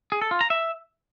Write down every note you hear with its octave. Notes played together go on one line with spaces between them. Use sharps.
G#4
A4
F4
A#5
E5